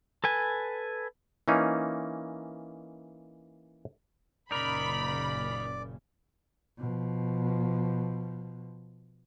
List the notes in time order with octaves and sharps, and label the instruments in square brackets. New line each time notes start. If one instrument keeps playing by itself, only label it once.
[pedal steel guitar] A4 B4 G#5
[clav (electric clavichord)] E3 A#3 C#4 D#4
[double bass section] F#1 A#2 C#3 [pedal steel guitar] D#4 A#4 [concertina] D5 [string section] B5
[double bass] B2 F3